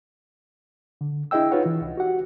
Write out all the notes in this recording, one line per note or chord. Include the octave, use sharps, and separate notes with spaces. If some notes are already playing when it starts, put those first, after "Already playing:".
D3
D4 E4 G#4 D#5 G5 E6
D#4 F4 B4 C#5 F#5
E3
C2
F#4 G4 F#5